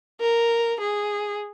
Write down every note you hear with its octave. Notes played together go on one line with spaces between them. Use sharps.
A#4
G#4